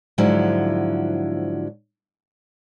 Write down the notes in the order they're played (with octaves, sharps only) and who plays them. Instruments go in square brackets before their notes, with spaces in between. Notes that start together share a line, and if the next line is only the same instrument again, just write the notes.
[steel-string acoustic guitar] G#2 D3 F3 F#3 E4